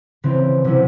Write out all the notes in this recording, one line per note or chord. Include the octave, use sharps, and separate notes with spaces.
C#3 E3 C4
C3 F#3 C#4 E4